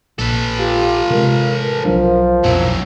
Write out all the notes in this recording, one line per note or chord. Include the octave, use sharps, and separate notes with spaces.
A#1 A4 B4
F4 G4
C3 G#3 A#4
B1 F3 F#3 D4
B1 F2 B2 F#3 E4